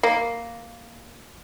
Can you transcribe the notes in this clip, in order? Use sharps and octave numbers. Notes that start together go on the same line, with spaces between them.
A#3